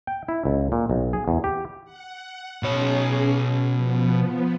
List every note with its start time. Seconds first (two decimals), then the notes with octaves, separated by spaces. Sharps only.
0.07 G5
0.28 E4
0.45 C#2
0.72 A#2
0.90 B1
1.13 G#4
1.28 E2
1.44 G4
1.85 F#5
2.63 B2 C#4 G#4 C#5
3.71 F3 B3